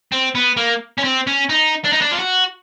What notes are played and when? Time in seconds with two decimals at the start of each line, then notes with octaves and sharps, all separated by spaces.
0.12 C4
0.35 B3
0.57 A#3
0.98 C#4
1.04 C4
1.27 C#4
1.49 D#4
1.84 D4
1.92 D#4
2.01 D4
2.11 F4
2.19 F#4